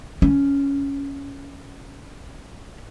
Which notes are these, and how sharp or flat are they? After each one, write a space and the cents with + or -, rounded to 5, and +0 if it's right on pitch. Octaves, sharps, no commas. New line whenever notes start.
C#4 +5